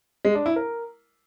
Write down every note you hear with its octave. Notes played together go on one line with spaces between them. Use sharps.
G#3
D4
E4
A#4